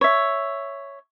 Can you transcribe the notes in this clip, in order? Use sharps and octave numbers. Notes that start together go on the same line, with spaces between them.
C#5 E5